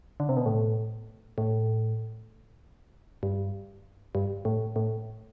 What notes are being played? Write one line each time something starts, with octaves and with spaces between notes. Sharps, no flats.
D3
C3
B2
A2
A2
G2
G2
A2
A2